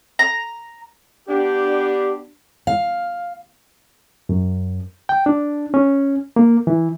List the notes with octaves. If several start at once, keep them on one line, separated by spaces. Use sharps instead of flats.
A#5
B3 D4 G4
F5
F#2
G5
D4
C#4
A#3
E3